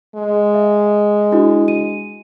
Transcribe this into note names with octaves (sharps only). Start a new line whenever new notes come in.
G#3
E5
D4 E4 F#4
D#7